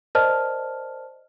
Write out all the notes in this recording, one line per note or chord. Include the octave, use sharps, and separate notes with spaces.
A#4 C5 D5 D#5 A5 F6